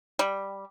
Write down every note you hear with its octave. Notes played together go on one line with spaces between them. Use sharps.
G3